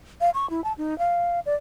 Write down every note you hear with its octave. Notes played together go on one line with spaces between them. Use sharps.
F5
C#6
E4
A5
D#4
F5
D5